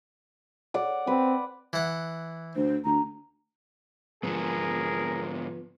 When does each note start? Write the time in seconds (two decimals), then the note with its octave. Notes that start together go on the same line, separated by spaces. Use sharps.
0.74 D5 F#5
1.07 C4 B4
1.73 E3 F#5
2.56 D2 C5
2.85 D2 A#5
4.23 G#2 D3 F3 B3 G#4 A#4